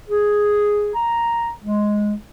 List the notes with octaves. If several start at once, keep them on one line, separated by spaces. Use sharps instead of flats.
G#4
A#5
G#3